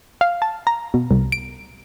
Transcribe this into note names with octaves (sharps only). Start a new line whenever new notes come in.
F5
A5
A#5
B2
C2
D7